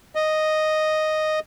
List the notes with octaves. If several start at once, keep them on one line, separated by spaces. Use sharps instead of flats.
D#5